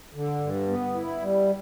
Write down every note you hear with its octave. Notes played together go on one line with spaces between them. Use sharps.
D3
G2
B3
E4
G3